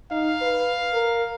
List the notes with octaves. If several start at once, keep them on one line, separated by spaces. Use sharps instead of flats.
D#4 F5
B4
A#4